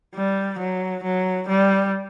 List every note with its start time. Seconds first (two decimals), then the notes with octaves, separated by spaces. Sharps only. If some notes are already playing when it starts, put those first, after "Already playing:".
0.15 G3
0.59 F#3
1.03 F#3
1.48 G3